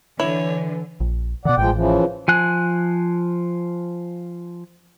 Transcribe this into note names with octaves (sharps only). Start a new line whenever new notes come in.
D3 E3 E4 C#5
A#1
B2 D#3 D5 F#5
A1 F3 G#3 G5
C#3 E3 F3
F3 G#5 F#6